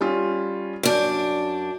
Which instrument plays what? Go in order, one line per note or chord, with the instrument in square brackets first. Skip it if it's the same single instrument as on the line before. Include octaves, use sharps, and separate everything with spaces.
[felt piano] G3 C#4 F4
[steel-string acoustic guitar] F#2 D4 [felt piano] G6 D7